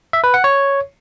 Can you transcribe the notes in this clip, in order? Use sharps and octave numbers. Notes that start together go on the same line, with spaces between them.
E5
B4
F#5
C#5